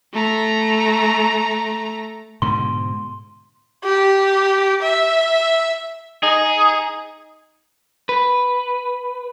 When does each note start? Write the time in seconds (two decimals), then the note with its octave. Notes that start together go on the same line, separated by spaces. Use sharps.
0.13 A3 A#5
2.42 G#2 B2 D3 C6
3.84 G4
4.82 E5
6.23 D#4 G#4
8.09 B4